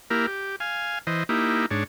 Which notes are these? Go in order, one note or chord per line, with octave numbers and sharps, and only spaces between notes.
A#3 E4 G4 A#4
G4
F5 G#5
E3 C5 D#5
A#3 D#4 E4 G4
G#2 D4 C#5